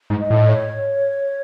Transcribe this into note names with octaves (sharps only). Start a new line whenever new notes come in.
G#2
D#5
A2
C#5